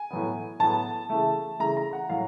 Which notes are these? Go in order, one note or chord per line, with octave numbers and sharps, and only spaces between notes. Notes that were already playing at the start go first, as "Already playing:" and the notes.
Already playing: G#5
A2 F#3 B3
A2 F#3 B3 A5
C#3 E3 A3
C#3 E3 A3 A#5
A#5
F#5
A2 F#3 F5